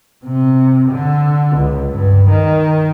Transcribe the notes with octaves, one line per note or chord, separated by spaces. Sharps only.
C3
D3
C#2
G2
D#3